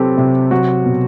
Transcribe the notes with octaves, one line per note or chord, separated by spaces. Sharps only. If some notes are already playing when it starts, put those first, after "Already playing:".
Already playing: C3 F#3 C4 G4 A4 B4
C3
F#3 F#4
B2